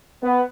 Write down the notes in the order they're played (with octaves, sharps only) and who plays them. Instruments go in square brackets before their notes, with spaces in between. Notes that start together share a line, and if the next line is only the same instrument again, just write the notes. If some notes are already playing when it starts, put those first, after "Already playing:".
[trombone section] B3